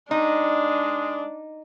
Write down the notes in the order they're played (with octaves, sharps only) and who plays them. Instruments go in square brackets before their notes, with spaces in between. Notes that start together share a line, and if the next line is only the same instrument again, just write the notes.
[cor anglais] G#3 [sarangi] D4 [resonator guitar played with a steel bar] D#4